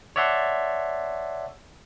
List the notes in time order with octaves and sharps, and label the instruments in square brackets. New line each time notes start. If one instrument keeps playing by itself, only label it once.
[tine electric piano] C#5 D5 E5 F#5 A5 C6